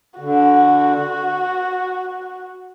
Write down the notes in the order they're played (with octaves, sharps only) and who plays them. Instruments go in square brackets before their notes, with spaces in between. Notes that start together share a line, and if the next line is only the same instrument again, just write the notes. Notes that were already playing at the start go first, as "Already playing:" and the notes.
[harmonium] D3 [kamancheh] F#4